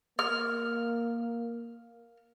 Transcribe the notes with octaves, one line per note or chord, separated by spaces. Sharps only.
A#3 F6